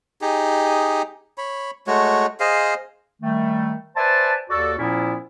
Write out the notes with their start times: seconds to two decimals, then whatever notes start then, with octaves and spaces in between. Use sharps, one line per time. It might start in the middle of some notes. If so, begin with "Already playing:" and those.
0.21 D#4 G4 G#4
1.38 C#5 B5
1.87 G#3 A3 F#4 C#5
2.40 G#4 C5 D#5 F5
3.21 D#3 G3 A3
3.96 B4 C5 D5 E5 G#5 A5
4.50 D#2 F#4 A4 D5
4.79 A#2 F3 B3 C#4 E4